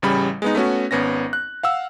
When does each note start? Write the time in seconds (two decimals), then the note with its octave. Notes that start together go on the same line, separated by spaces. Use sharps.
0.02 A1 C#3 G3 B5
0.42 G#3 B3 D#4
0.55 A3 B3 C#4 F#4
0.91 G#1 B3 C#4 A#6
1.33 F#6
1.63 F5 F#5 E6